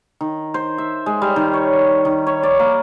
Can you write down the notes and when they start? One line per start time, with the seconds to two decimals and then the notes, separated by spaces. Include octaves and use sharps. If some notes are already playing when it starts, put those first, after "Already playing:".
0.21 D#3
0.54 C5
0.78 E5
1.06 G#3
1.22 G3
1.36 D#3
1.53 C#5
2.05 D#3
2.27 C#5
2.43 D5
2.59 A#3